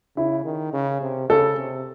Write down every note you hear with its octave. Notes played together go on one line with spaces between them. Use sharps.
C#3 E4
D#3
C#3
C3
C#3 A4
C3